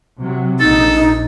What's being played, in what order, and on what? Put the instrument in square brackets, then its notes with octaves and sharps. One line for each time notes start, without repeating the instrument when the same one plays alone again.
[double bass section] C3 F#3
[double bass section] A#1 A#2 [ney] D#4 [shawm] A4